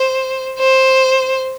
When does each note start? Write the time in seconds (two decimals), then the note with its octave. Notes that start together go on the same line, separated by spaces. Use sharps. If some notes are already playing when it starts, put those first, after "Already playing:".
Already playing: C5
0.60 C5